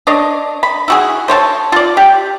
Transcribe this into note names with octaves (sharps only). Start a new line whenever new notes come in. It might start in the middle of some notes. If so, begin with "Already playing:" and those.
D4 C#5 D#5
B5
E4 F#4 G#4
C5 C#5 F5 A5
F4 D5
G4